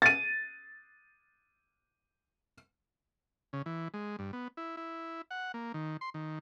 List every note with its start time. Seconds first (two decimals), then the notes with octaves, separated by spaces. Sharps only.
0.02 A6 D#7
3.53 C#3
3.66 E3
3.94 G#3
4.19 G2
4.33 B3
4.57 E4
4.77 E4
5.31 F#5
5.54 A#3
5.74 D#3
6.01 C6
6.14 D#3